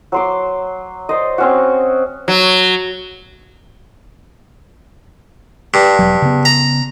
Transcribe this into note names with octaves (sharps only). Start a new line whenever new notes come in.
F#3 C6 D6
C5 D5 D#5
C4 C#4 F#4
F#3
G2
E1 F#3
C#3 B3
A#5